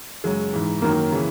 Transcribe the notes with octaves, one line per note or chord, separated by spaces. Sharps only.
F#2 C#3 F#3 G#3
G#2 E3
F#2 D#3 F#3 A#3
C#3 E3